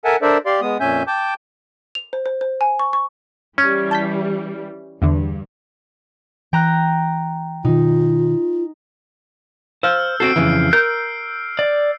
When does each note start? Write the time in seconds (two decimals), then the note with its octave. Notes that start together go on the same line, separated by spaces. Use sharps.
0.05 A4 A#4 E5 F#5 G#5 A5
0.22 D4 A4 A#4 C5 D5 E5
0.46 G4 D5 F5 C6
0.61 G#3 B3 D#6
0.80 F2 A#2 C#4 E5 G#5 G6
1.07 G5 A5 D6 G6
1.95 F7
2.13 C5
2.26 C5
2.41 C5
2.61 G#5
2.79 C#6
2.93 C#6
3.58 E3 G3 C#4
3.91 A5 G6 B6
5.02 E2 G2 D3
6.53 E3 G5 A#5 F#6
7.65 B2 D#3 D#4 F4
9.83 C5 F5 E6 F6 G6
10.20 C4 F#4 A4 C7 D7
10.36 F2 C#3 E3
10.73 A#4 G6
11.59 D5